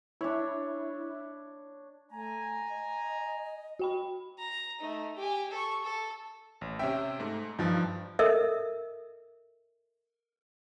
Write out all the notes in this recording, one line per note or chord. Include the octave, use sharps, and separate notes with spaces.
D4 E4 C#5
A3 G#5 A#5
D#5
F#4 G5 B5
A#5
A3 D#4
G4 G#5
A4 C#6
A4
A1
C3 C#4 E5 G5
G#2 A3
G2 F3 D#4
A4 A#4 D#5 E5